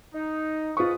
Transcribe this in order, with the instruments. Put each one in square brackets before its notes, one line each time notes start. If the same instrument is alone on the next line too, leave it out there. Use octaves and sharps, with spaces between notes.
[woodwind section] D#4
[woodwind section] G#2 B4 D#6 [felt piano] F4 C#6